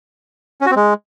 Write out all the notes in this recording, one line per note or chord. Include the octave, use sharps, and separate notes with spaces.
C#4
F#4
C4
G#3